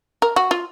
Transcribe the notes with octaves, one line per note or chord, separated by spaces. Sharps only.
A#4
F#4
F4